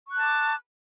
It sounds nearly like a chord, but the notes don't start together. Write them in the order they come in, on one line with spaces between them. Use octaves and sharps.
C#6 F#6 A5 D6